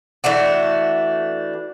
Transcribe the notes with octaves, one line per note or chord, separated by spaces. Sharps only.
E3 A3 D4 F#4